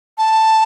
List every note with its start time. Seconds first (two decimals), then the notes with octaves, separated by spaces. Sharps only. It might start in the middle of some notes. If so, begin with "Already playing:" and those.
0.18 A5